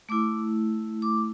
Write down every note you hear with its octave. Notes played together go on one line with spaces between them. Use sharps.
A3 E4 D6
D6